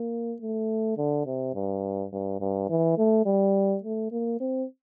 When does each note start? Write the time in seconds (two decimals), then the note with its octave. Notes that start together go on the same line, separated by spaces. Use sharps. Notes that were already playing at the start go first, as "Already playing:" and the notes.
Already playing: A#3
0.41 A3
0.97 D3
1.26 C3
1.54 G2
2.12 G2
2.41 G2
2.69 E3
2.98 A3
3.26 G3
3.83 A3
4.12 A#3
4.40 C4